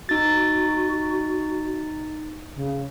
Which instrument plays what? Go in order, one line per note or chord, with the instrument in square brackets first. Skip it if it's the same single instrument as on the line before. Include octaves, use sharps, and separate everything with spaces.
[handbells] D#4 A6 [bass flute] F#4
[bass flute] C#3